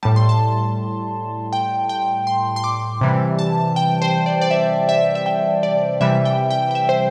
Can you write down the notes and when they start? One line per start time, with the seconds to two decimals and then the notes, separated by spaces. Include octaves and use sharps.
0.03 A2 G3 A5
0.16 C6
0.29 A5
1.53 G5
1.89 G5
2.27 C6
2.56 C6
2.64 D6
3.01 C3 E3 G3
3.39 A5
3.76 G5
4.02 C5
4.26 D5
4.41 D5
4.51 E5
4.89 E5
5.15 E5
5.26 G5
5.63 D5
6.01 C3 E3 G3 E5
6.25 G5
6.50 G5
6.71 G5
6.75 E5
6.89 C5